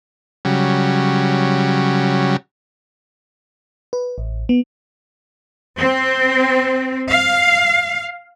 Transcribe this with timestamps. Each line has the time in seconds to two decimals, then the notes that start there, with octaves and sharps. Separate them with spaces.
0.45 C#3 F#3 G3
3.93 B4
4.18 A1
4.49 B3
5.77 C4
7.09 F5